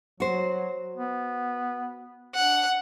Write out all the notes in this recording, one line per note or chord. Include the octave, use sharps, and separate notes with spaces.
F#3 F#4 C5
B3
D4 F#5